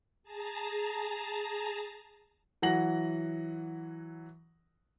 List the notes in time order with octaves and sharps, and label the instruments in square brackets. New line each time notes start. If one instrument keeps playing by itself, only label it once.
[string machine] G#4 A5 A#5
[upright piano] E3 F#3 F#5 A#6 F#7